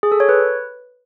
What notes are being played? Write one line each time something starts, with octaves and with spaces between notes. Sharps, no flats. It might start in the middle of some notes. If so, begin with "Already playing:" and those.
G#4
A4
C#5
B4